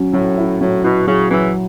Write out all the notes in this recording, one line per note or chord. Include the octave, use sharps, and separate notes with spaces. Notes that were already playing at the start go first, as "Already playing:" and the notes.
Already playing: F#3 C#4
A2 F#3
E4
A2 F#3
B2 E4
C#3 F#3
C#3 E3 F#3